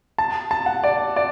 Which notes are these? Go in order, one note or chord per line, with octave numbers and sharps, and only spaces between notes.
A5
A5
F#5
D5
D5